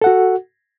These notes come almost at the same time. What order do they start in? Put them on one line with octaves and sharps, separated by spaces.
A4 F#5 F#4